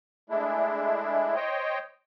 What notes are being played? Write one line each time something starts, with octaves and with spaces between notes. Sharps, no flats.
G#3 A3 D4 E4
C5 C#5 D#5 G5